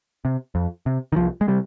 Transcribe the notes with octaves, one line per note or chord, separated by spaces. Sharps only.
C3
F2
C3
D#3
C2 F3
G#3
C3 G3